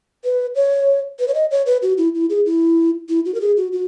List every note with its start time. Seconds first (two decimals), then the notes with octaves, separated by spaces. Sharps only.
0.24 B4
0.55 C#5
1.20 B4
1.28 C#5
1.35 D#5
1.51 C#5
1.66 B4
1.82 F#4
1.98 E4
2.15 E4
2.30 G#4
2.46 E4
3.09 E4
3.25 F#4
3.35 A#4
3.41 G#4
3.57 F#4
3.72 F#4